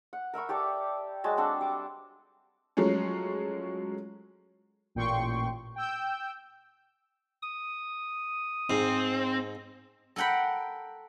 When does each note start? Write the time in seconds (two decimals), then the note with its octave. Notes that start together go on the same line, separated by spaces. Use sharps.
0.13 F#5
0.34 A#4 E5 B5 C#6
0.49 G4 A4 D5
1.24 F#3 G#3 F#4 A5
1.37 C4 D4 A4 F#5
1.61 G3 D6
2.77 F3 F#3 G#3 A3 C#4
4.95 A1 A#2 G5 C6 C#6
5.76 G5 E6 G6
7.42 D#6
8.70 G#2 C4
10.16 A4 A#4 F#5 G5 B5